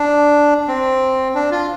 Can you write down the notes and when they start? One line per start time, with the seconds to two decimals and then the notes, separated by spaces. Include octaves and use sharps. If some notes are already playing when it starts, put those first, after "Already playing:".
Already playing: D4
0.68 C4
1.35 D4
1.51 F4